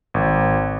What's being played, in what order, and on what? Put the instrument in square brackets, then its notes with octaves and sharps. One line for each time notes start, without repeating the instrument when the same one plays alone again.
[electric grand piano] G#1